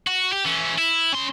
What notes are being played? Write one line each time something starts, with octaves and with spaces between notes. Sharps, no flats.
F#4
G4
E3 C#4
E4
C#4 C6